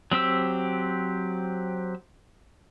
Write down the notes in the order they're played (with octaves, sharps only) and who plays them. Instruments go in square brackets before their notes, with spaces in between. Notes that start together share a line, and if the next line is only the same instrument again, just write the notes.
[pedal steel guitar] F#3 C4 G4 E6